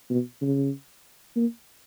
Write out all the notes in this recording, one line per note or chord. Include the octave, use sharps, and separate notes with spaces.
B2
C#3
A#3